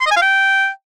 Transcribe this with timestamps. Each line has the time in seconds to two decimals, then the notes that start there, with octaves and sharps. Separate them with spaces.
0.01 C6
0.06 D#5
0.11 G#5
0.17 F5
0.22 G5